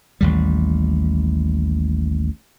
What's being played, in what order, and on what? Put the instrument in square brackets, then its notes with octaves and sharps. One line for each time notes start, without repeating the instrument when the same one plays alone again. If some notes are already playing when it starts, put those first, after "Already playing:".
[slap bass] A1 D#2 G3